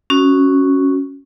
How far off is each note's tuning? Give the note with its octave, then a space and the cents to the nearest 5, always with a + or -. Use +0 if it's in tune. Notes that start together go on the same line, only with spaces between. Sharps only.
C#4 +0 F#4 +0